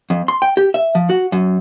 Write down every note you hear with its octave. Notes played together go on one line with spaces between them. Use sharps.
F2
C6
G5
G4
E5
F3
F#4
F#2